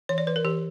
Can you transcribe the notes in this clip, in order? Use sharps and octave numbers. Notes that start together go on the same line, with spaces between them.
E3 C#5
D5
E3 B4
A#4
E3 G4